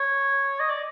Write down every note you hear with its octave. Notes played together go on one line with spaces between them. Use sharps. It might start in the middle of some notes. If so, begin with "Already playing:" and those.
Already playing: C#5
D#5
D5